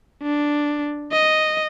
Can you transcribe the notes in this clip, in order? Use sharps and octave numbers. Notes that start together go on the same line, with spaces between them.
D4
D#5